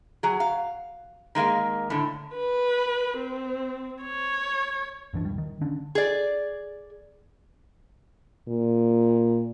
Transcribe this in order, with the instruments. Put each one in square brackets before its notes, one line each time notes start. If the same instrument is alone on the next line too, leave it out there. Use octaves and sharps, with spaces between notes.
[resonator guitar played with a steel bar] F#3 G#4
F5
D#3 G#3 A#3 F5
A2 D3
[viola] B4
C4
C#5
[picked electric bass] G2 E3 D4
E1 G3
D#3
D3 C#4 D4
[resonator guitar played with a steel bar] G#4 D5
[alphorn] A#2